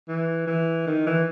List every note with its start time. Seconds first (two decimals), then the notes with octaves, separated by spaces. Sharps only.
0.08 E3
0.47 E3
0.87 D#3
1.06 E3